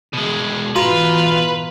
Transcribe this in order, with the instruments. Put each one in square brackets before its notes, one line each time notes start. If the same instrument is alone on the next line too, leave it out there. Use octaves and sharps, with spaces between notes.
[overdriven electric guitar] B2 G#3
[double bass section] G#2 B2 E3 [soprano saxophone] F4 [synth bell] F#4 A#5 C6 [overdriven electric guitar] B4